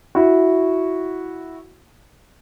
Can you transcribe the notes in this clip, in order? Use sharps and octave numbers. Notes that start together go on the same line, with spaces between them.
E4 F#4